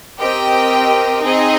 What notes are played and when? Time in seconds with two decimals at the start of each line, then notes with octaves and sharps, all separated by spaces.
0.19 C4 G4 A#4 D#5 G5
1.24 C4 D#4 G#4 D#5